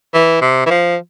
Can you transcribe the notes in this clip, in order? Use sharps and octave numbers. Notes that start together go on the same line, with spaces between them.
E3
C3
E3
F3